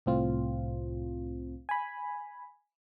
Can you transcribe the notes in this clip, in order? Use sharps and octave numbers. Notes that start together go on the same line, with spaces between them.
C2 A2 C4 F4
G#5 B5